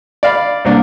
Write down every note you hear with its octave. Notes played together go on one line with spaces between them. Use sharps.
D5 F5 B5
C2 A#3 D4